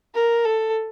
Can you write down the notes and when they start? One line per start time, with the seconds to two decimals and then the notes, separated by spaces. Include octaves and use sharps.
0.15 A#4
0.45 A4